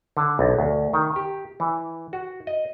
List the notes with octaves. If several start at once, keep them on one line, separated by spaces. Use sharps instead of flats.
D3
B1
D2
D#3
G4
E3
F#4
D#5